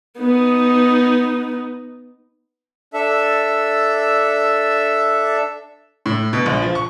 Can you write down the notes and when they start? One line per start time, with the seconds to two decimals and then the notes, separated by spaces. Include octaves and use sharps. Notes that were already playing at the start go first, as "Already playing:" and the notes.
0.18 B3 D#4
2.94 D4 A4 E5
6.06 A2
6.33 B2
6.46 A#1
6.62 F3
6.75 C#6